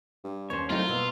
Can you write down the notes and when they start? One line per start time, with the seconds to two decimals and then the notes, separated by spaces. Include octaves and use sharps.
0.24 G2
0.50 D#2 C#4 C5 C#5
0.70 C2 F#3 A3 C4 D#4 F4
0.89 B2 A#3 B3 E6